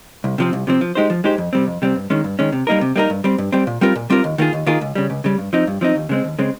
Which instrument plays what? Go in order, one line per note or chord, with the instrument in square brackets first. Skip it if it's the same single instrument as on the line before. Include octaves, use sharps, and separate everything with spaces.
[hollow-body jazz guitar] C2
C3 F3 C4
C2
C3 F3 C4
F3
G#3 D#4 G4 C5
F3
G#3 D#4 G4 C5
F2
C3 G3 C4
F2
C3 G3 C4
G2
D#3 G#3 C#4
G2
D#3 G#3 C#4
C3
G3 A#3 D#4 A#4
C3
G3 A#3 D#4 A#4
G2
G3 C4
G2
G3 C4
A#2
G3 C4 F4 A#4
A#2
G3 C4 F4 A#4
D#2
D#3 A#3 F4 G#4
D#2
D#3 A#3 F4 G#4
C#2
C#3 G3
C#2
C#3 G3
G2
F3 C4 D#4
G2
F3 C4 D#4
D#2
C#3 G#3 C4
D#2
C#3 G#3 C4